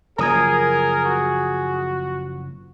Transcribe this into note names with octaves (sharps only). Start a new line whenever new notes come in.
F#1 F3 G#4 A#4 A#5 D#6 G#6
F#4